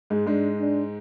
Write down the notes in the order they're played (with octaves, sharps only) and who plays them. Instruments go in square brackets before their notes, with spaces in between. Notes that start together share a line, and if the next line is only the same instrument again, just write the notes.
[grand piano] G#2 G#3
[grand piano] G#2 G#3 [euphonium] D4
[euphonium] D4